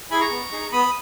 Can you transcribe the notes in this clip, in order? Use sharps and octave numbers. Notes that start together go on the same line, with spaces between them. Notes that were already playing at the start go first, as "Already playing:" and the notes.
E4 G#4 G#5 B5
A#5 C#6
B3
D#4 G#4
B3 B5 D#6